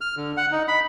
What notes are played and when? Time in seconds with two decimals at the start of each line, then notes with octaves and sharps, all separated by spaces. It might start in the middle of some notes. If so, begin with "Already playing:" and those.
0.01 F6
0.17 D3
0.37 F#5
0.52 D#4
0.68 B5